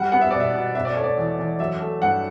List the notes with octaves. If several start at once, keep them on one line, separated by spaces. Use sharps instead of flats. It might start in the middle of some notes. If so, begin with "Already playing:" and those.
Already playing: G3 F#5
B3 F#5
E5
B2 D5
E5
B2
B2 E5
D5
A3 C#5
D5
E2
E2
F#3 E5
A3
G2 F#5